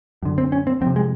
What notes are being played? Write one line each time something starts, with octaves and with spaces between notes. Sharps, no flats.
F#2 D3
C4
C#4
C4
F2 C4
C3
G#3